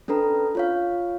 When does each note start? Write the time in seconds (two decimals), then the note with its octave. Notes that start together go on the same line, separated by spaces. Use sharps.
0.08 C#4 D4 A4 B4 A#5
0.55 F4 C#5 F5